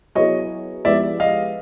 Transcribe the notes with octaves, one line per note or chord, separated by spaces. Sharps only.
F#3 B3 E4 G#4 C#5 D#5
F3 G#3 B3 E4 G4 D5 E5
D#5 F5